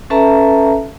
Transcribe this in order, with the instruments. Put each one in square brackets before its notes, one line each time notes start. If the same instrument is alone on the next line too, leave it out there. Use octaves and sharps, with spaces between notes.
[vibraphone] C#4 A4 B4 E5 A5 A#5